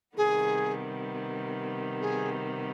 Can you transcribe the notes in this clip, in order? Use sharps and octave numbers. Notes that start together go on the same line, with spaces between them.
C3 D#3 G3 B3 G#4
G#4